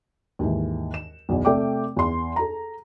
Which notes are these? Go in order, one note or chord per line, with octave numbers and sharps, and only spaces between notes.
D#2 G#2 E3
E7
B1 E2
C3 A3 D5 G5 D6
E2 C6
A4 A#5